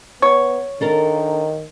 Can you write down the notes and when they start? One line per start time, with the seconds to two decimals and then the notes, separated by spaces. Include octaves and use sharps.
0.22 B3 C#5
0.81 D#3 D4 A4 A#4